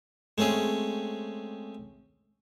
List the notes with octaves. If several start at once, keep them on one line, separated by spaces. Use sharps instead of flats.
G#3 A3 C4 C#4 G#4